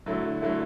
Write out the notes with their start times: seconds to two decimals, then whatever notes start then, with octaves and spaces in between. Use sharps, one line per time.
0.06 D3 F#3 A3 E4
0.42 D3 F#3 A3 E4